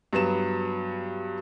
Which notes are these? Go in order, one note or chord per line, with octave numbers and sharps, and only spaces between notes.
G2 F#3 B3 E7